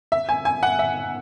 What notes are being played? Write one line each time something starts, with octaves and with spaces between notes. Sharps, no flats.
E5
G#5
G#5
F#5
E5